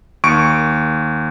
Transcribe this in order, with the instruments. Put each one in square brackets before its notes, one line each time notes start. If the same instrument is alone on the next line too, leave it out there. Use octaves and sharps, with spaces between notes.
[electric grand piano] D#2 C#6 D7